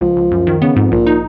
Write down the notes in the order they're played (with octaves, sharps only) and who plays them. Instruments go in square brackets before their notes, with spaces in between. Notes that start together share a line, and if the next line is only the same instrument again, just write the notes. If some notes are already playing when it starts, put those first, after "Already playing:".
[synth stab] C#2 [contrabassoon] F3
[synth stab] C#2
F#2
D#3
[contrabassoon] C#3 [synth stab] B3
[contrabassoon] F2 [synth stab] G#2
[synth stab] A#1 [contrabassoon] A#2
[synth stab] D#4